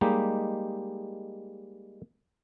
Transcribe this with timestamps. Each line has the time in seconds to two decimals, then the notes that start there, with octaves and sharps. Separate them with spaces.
0.01 G3 G#3 A#3 D#4 G4